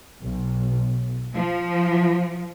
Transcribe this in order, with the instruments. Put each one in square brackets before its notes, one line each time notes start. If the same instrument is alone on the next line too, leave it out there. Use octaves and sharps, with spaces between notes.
[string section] B1
F3